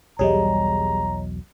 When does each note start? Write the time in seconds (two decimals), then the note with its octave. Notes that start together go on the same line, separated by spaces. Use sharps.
0.19 B1 E2 F#3 G3 G#4 C#5 D#5 A#5